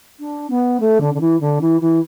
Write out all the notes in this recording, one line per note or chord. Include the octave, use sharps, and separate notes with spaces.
D4
B3
A3
D3
D3
E3
D3
E3
E3